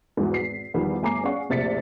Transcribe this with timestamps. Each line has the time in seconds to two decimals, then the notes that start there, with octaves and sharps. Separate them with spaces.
0.17 E2 G#2 B2 E3
0.34 G#1 B6 C7
0.74 E2 D#3 F3 G3
1.02 G1 A3 G#5 A#5 D6 C7
1.24 C#4 G#4 D5 F5 F#5 C#6
1.49 F1 A#1 C3 A6 B6 C#7